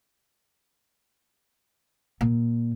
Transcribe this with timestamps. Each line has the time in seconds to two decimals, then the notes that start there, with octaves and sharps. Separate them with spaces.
2.21 A#2